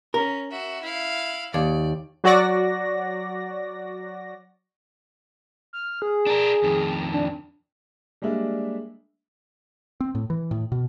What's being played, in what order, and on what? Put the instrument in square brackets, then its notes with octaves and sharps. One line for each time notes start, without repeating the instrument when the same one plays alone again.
[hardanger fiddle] C#4 [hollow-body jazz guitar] A#4
[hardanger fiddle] F#4 E5
E4 F5
[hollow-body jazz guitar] D#2 [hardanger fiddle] D5
[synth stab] F#3 F#4 D5 A#6
[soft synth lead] F6
G#4
[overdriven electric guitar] D4 A#4
F2 D#3
[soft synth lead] D4
[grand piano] G3 G#3 A#3 D4 E5
[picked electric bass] C4
A2
E3
A2
B2